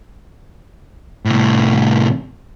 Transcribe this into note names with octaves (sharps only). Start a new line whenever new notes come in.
C2 A2